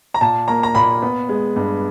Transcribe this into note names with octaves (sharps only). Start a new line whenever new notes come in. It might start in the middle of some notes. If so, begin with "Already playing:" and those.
A#5
A#2 A5
A#3 A#5
A#5
A#2 B5
B3
G#3
G2